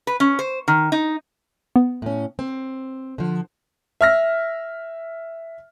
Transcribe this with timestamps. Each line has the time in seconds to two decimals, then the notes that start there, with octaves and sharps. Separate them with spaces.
0.07 B4
0.20 C#4
0.39 C5
0.68 D#3
0.92 D#4
1.76 B3
2.02 A2 C#4
2.39 C4
3.18 D3 F3
4.01 E5 F6 A#6